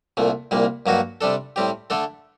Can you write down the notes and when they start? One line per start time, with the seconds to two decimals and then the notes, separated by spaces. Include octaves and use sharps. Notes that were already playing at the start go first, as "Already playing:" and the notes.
0.17 C2 A#2 A3
0.51 C2 A#2 G3 A#3
0.86 G2 F#3 A#3 D#4 F#4
1.21 C3 G3 D4 A4
1.56 A2 G3 C4 G4
1.90 D3 A3 D4 A4